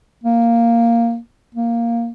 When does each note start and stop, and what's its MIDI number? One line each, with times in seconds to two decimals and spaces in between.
0.24 1.18 58
1.55 2.12 58